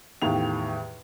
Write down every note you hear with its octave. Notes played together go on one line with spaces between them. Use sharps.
E2 A2 D#3 G4 F5 F7